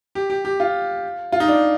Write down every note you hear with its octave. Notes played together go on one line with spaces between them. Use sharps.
G4
G4
G4
F4
F4
D#4
D4